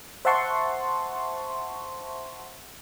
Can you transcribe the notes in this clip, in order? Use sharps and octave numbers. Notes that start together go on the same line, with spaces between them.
C5 E5 F#5 A5 C6 C#6